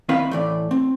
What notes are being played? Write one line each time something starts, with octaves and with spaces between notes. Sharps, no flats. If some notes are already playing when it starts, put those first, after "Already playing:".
D#3 C4 E4 B4 F5 B5
A2 E3 D5
C4